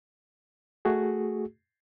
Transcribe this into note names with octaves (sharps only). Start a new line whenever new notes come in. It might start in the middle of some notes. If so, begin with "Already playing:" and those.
A3 F#4 G#4